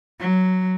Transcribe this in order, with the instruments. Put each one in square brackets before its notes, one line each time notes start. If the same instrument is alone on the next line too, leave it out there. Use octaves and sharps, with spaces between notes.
[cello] F#3